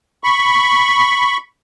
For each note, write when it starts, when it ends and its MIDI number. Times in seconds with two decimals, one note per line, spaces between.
0.24 1.37 83
0.24 1.37 85